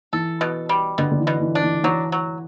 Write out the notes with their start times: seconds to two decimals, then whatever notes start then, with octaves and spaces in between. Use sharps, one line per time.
0.13 E3 A4
0.41 B2
0.69 G3
0.98 B2 D3
1.11 D3
1.20 E3
1.27 B2
1.41 E3
1.55 D4
1.63 E3
1.83 E3 F#3
2.12 F#3